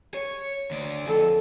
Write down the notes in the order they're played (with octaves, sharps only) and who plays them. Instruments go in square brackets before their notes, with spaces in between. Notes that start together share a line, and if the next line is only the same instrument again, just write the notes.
[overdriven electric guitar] C#5
D2 D5
[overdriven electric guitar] F2 [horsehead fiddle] A4